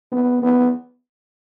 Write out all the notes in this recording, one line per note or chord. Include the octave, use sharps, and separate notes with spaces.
B3
B3